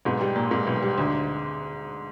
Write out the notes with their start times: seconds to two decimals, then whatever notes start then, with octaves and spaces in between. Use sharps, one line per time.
0.05 B1 G#2
0.21 G3
0.36 A#2
0.51 G#2 A#3
0.67 B1
0.82 G3
0.97 D2